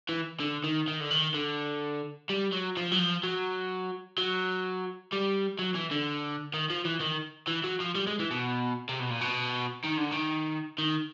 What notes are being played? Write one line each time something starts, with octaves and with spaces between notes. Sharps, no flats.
E3
D3
D#3
D#3
D3
D#3
D3
G3
F#3
F3
F#3
F3
F#3
F#3
G3
F#3
E3
D3
D#3
F3
E3
D#3
E3
F#3
F3
G3
G#3
E3
B2
C3
B2
A#2
B2
D#3
D3
D#3
D#3